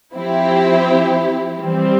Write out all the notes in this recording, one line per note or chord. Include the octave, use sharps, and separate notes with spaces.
F3 C4 E4 G4
E3 G3 C4